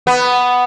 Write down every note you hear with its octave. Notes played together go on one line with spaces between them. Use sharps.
B3